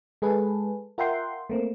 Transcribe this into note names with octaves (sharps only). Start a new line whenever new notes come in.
G#3 G#4 A4 B4
F4 A#4 E5 F#5 G5 C6
A3 A#3 C4